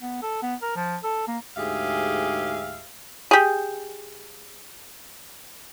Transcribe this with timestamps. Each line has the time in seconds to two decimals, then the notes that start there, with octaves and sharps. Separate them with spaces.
0.01 B3
0.22 A4
0.42 B3
0.62 A#4
0.76 F3
1.04 A4
1.27 A#3
1.56 D2 G#2 G4 G#4 E5 F5
3.31 G4 G#4